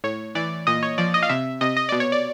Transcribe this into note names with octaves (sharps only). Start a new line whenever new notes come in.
A2 C#5
E3 D5
A#2 D#5
C#5
F3 D5
D#5
F5
C3 E5
C3 D#5
D#5
B2 D5
C#5
D5